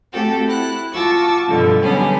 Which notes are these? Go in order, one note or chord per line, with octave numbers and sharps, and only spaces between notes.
A3 C4 F#4 G4 A4 G5
E4 F#6
F4 F#4 A5 C#6 D6 E6
G2 B2 D3 F3
D3 F#3 G3 B3 C#4 G#4